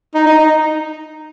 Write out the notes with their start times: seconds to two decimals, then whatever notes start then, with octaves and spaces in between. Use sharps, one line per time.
0.15 D#4
0.26 D#4
0.39 D#4